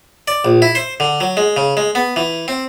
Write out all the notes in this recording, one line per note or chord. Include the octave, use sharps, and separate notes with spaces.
D5
A#1
E4
C5
D3
F#3
G#3
C#3
G#3
B3
E3
C4